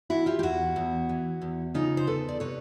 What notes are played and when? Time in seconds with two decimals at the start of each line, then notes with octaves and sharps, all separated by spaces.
0.10 E3 E4 F#4
0.26 F4 G4
0.39 G4
0.43 E2 E4 F#4
0.76 E2
1.09 E3
1.41 E2
1.74 C#3 D#4 F4
1.97 C5
2.07 E2 A4 B4
2.29 D5
2.40 C3 B4 C#5